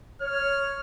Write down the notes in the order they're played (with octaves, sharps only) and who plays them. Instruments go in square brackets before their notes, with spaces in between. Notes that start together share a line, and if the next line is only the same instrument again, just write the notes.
[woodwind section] C#5 [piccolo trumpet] F6